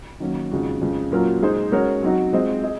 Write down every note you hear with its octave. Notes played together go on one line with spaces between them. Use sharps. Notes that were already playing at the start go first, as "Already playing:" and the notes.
D#3 F#3 A#3 C#4
F2 C#3 G#3 D#4 F#4
F2 C#3 G#3
A#2 F#3 C#4 F4 A#4
A#2 G#3 D#4 G#4 C5
G#3 C#4 F#4 A#4 C#5
F#3 C4 D#4 F#4
G#3 C4 F4 C5 D#5
G#4 D#5